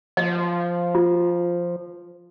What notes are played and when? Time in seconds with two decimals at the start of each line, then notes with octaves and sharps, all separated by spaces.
0.17 F3 D#5
0.95 F4